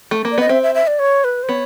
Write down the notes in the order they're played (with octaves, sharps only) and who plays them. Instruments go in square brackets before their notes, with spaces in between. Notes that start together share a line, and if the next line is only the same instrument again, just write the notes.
[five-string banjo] A3
A#3
[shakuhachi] D5
[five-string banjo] B3 [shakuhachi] D#5
[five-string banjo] C4 [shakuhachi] E5
[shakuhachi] E5
E5
D5
C#5
B4
C5
[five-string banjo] B3 [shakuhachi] C#5